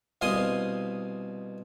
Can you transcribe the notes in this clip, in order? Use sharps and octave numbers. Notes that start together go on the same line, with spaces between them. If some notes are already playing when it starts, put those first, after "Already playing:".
C2 B2 F5 G#5 C6 D#6